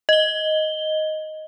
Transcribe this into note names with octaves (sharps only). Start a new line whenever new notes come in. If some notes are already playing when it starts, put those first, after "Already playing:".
D#5 G7